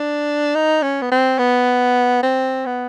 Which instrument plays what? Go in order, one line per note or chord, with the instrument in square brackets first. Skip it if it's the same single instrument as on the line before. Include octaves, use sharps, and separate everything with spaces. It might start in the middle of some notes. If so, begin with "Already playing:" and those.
Already playing: [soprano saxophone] D4
D#4
C#4
B3
C4
B3
C4
B3